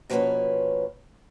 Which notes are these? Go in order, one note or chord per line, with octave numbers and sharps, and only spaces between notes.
B2 F3 A#3 C#4 B4 C#5